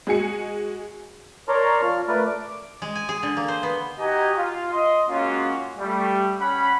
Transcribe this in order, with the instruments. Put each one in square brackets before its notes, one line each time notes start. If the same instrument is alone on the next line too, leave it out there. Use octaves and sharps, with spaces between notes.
[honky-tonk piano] G#3 F#4 G#5 C#7
[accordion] A#4 C#5 D5 A5 A#5 C6
F3 F6
A3 A#4 B4 D5
D6
[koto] G#3
G#5
G#4
D3
A#3
C5
B3
[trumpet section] D#4 F#4 G4 D#5 G#5 A#5
F4
D#5 C6
G#3 A#3 C#4 F4 F#4
G3 A3
G3 C#4 F#5 B5